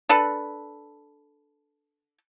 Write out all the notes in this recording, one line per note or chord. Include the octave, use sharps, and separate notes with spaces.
D4 A4 B4